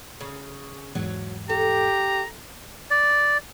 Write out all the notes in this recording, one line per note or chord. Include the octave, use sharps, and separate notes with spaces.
C#3
E2 G#2 F#3
G4 A4 A#5
D5